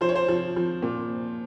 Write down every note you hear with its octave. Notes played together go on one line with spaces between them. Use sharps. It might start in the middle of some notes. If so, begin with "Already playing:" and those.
F3 C5
C#5
C5
F3
F3
A#2